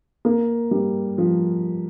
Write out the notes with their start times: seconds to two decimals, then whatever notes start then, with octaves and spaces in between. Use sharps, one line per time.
0.25 A#3
0.71 G3
1.18 F3